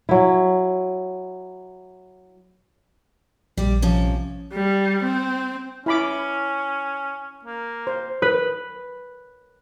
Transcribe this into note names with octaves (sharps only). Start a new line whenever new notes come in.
F#3 E4
A#1 G3 D5
C3 F3 C#4
G3
C4
C#4 E4 B5 D6
A#3
C5
B4